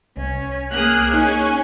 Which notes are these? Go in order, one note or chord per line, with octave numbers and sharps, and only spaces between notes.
C2 C#4
A#3 G#4 D#6 F6 F#6
C#4 D#4 G#5 F#6